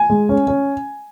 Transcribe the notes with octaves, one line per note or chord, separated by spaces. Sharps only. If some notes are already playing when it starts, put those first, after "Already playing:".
Already playing: G#5
G#3
C#4
C#4